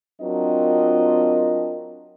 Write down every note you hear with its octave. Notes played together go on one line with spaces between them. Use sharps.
F#3 C4 D4 F4 A#4 D#5